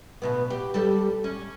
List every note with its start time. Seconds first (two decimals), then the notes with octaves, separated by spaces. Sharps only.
0.22 D2 B2 B3
0.50 G4
0.74 G3 G4 A4
1.24 C#4